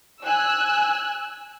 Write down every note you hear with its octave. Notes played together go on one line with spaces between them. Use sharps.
G#5 E6 F#6